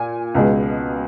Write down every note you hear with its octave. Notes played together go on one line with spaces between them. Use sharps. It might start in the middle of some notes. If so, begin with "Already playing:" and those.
Already playing: A#2 G#5
C#2 B2 G#3